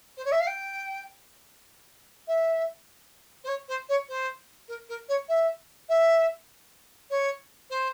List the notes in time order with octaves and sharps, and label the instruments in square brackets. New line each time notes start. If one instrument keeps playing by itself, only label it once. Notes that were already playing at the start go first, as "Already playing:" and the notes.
[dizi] C5
C#5
E5
F5
G5
E5
C5
C#5
C5
C#5
C5
A#4
A#4
C#5
E5
E5
C#5
C5